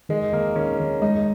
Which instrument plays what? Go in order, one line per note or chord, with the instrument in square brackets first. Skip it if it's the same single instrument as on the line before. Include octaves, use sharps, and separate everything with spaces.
[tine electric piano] D#3 [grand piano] G#3
[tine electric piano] D#3 [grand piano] A#3
[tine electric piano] D#3 [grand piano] C#4
[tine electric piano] D#3
[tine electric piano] G#3 [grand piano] D#4